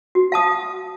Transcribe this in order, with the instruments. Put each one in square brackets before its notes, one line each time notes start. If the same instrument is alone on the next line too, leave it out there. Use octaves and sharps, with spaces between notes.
[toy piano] F#4
F5 A5 D#6